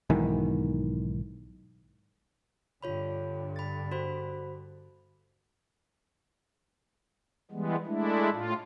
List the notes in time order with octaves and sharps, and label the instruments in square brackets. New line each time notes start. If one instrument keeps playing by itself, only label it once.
[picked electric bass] B1 G#2 D#3 E3
[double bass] G2 D3 [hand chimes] F4 C#5 B5
[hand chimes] B5 A6
F#4 C5 B5
[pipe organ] E3 G3 G#3 B3
G#3 A3 D4 E4
A2 F4